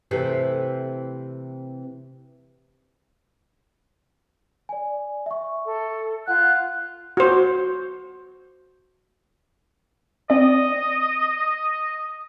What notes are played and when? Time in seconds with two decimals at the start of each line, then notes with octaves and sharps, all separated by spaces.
0.11 C3 E3 A3
4.69 D5 G#5
5.26 E5 C#6
5.64 A4
6.28 F4 F#5 F#6
7.17 F#4 C5
10.30 C4 D5 D#5